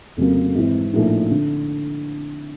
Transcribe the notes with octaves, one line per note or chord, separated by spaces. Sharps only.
F1 F2 C#3 F#3 A#3
G#1 G#2 E3
A#1 A2 F3 A#3 D#4
D3